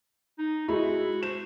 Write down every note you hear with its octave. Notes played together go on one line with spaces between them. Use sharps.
D#4
G#3 E4 F#4
C5 E7